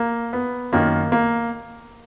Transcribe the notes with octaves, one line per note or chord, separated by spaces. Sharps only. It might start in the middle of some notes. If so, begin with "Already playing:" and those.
Already playing: A#3
B3
F#2 D#3 A#3
A#3